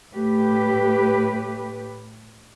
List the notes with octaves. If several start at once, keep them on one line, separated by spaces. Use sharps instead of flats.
A2 A3 G4 B4